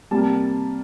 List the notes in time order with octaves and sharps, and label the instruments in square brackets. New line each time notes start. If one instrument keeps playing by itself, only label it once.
[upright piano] C3 G3 A#3 A5